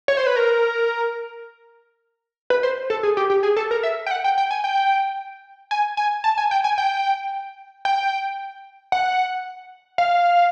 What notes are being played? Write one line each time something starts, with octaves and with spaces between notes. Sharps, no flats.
C#5
C5
B4
A#4
B4
C5
A4
G#4
G4
G4
G#4
A4
A#4
E5
G5
F#5
G5
G5
G#5
G5
G#5
G#5
A5
G#5
G5
G#5
G5
G5
F#5
F5